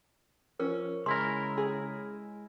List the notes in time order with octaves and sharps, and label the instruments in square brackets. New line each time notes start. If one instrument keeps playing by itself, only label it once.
[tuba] F3 [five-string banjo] C#4 [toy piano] A#4
[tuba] C#3 [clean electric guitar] G#3 E4 A#4 [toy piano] C6
[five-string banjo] G#4